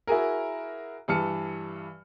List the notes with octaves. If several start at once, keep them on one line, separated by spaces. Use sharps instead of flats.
E4 F#4 G#4 A#4
G2 E3 A5 F6 C#7